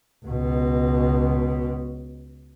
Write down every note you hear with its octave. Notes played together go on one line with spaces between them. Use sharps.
C#2 B2